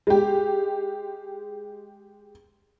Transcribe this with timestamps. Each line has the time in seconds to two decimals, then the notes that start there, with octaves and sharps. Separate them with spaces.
0.07 G#3 G4